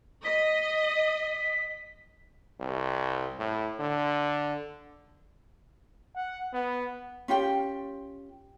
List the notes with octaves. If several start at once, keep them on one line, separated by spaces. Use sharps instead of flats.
D#5 B6
C2
A2
D3
F#5
B3
C#4 F4 G4 G5